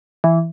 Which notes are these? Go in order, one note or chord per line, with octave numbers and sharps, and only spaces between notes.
E3